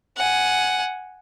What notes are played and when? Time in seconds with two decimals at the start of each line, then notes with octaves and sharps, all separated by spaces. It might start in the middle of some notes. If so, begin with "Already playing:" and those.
0.17 F#5 G#5